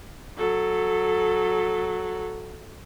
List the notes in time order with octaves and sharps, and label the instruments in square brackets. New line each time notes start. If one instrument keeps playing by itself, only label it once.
[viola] F#3 A4